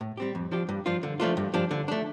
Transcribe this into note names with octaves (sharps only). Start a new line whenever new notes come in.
A2
G3 C4 G4
F2
F3 D4 G4
G2
F3 D4 F4
D3
F3 A3 D4 F4
G2
F3 D4 G4
D3
A3 D4